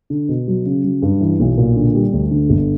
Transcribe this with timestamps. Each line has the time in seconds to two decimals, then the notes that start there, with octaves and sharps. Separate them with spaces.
0.10 D3
0.29 B2
0.48 F#3
0.66 C#3
0.84 F#3
1.02 G2
1.21 E3
1.39 B1
1.58 A#2
1.76 D3
1.94 G3
2.13 D2
2.31 D3
2.50 G1